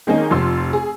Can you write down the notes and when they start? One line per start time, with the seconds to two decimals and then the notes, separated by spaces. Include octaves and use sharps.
0.07 D#3 G#3 A#3 C4 C#4 D#4
0.31 F1 F3 F4 C6 E6
0.73 G#4